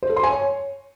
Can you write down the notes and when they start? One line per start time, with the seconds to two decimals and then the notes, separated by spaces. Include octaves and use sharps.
0.03 C5
0.09 A4
0.16 C6
0.23 G#5
0.30 C#5